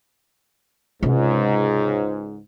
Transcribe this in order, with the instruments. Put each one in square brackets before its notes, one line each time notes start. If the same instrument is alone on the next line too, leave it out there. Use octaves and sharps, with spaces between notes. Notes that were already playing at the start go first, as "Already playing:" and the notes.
[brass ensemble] C#2 G#2 [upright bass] C3 F4